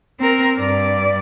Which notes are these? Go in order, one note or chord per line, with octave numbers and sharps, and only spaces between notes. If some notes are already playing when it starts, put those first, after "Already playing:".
C4 A#4
G2 D5